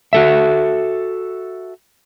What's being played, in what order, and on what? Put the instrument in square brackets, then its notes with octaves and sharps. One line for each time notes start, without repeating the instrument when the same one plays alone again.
[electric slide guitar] F#4 A4 E5